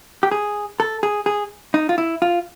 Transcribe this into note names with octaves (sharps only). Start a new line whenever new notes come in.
G4
G#4
A4
G#4
G#4
D#4
F4
E4
F4